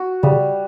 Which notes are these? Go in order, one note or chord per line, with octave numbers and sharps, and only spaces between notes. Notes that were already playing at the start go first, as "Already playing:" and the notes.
Already playing: F#4
C#3 G3